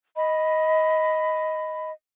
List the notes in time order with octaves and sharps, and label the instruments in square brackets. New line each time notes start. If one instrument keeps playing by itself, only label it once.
[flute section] D#5 B5